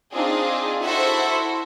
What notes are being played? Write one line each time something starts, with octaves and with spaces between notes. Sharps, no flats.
C4 D4 D#4 F4 G#4
E4 F#4 A4 C5 E5 F#5